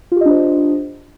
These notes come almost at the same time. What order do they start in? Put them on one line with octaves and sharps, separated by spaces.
F4 G4 D#5 D4 C5